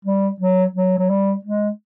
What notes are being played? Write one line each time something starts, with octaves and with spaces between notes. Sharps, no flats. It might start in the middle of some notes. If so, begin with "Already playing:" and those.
G3
F#3
F#3
F#3
G3
G#3